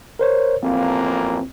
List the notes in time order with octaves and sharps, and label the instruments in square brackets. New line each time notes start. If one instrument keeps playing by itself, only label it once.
[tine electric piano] A#4 C5 C#5
[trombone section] A1 F2 A#3 [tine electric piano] C4